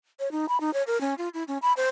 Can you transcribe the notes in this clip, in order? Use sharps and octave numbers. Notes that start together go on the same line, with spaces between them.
C#5
D#4
B5
D#4
C#5
A#4
C#4
F4
E4
C#4
B5
C5